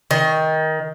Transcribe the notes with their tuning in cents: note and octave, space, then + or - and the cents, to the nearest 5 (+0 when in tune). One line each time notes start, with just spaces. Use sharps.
D#3 +20